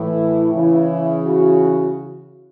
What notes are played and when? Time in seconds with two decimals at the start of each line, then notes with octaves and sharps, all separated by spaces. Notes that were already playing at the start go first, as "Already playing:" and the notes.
Already playing: A2 E3 E4
0.52 C#3 E3 E4
1.25 F#4